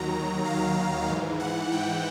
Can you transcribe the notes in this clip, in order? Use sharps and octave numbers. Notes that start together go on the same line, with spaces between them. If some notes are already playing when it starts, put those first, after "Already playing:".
Already playing: D#2 D#3 F#3 A#5
F5
G#2 E3
F#5
G5